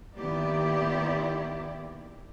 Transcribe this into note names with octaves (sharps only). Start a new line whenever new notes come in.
D#3 A#3 B3 E4 G4 D5